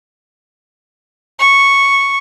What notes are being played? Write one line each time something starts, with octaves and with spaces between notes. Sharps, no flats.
C#6